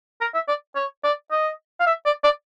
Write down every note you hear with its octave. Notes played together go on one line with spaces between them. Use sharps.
A#4
E5
D5
C#5
D5
D#5
F5
E5
D5
D5